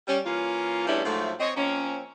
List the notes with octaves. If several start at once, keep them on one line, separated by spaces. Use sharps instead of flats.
G3 C#4
E3 A#3 C#4 F4
E2 G3 A3 C#4 D4 E4
G#2 F3 F#3 A3
C4 C#5 D#5
F3 A#3 C4 C#4